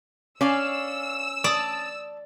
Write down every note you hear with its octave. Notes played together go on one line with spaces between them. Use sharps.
C#4 D5 F5 G#5 E6
D5 A5 D#6